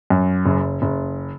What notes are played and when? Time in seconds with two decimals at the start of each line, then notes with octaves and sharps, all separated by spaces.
0.10 F#2
0.46 F#1
0.82 F#1